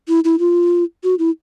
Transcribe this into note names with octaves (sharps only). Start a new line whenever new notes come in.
E4
E4
F4
F#4
E4